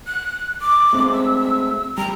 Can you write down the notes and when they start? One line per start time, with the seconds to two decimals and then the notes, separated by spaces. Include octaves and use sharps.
0.07 F#6
0.61 D6
0.93 G#3 A3 C4
1.13 E6
1.98 G3 A#5